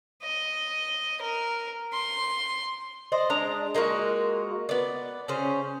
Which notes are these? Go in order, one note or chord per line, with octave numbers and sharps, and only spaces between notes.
D#5
A#4
C6
C5 D5 D#5
G#3 D4 A#5
G#3 A#3 F4 F#4
B3 D5
C#3 C#4 C5